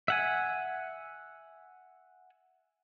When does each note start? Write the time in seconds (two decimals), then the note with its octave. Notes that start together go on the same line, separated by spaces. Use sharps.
0.08 E5 F#5 G#5